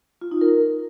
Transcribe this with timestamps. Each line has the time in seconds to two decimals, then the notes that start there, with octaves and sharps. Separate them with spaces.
0.21 F4
0.31 D#4
0.41 A#4